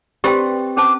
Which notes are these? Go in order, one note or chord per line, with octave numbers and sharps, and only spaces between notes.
C4 G4 B4 D5 G5
C#4 C5 A5 D6